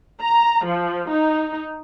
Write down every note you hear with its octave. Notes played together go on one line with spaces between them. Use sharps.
A#5
F3
D#4